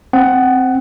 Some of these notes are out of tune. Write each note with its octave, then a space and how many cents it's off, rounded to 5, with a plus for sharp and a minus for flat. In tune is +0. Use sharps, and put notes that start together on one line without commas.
C4 +0 F#5 +15